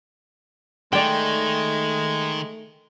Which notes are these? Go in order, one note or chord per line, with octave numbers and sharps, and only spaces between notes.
D#3 G#3 A3 D5 G5